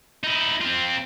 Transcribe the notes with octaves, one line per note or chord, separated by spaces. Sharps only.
D#4 E4
C4 F4